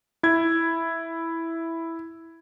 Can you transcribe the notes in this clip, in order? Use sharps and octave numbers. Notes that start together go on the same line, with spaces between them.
E4 G#6